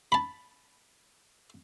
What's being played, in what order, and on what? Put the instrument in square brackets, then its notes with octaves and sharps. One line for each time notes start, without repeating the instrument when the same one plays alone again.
[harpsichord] A5 B5